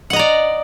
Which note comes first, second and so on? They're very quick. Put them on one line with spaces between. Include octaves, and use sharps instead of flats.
F#5 D#5 A#5 D5